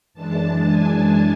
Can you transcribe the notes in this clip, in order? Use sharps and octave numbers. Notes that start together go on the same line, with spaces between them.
F#2 E3 G#3 D4 A5
G#5